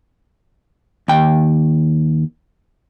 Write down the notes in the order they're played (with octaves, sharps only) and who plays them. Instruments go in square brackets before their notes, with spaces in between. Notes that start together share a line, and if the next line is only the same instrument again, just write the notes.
[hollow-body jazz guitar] D#2 G5